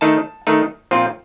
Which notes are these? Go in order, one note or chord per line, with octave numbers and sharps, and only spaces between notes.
D#3 A3 D#4 A5
D#3 A3 D#4
A#2 F3 C4 F4